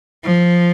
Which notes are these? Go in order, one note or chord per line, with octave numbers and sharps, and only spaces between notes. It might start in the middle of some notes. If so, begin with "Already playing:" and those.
F3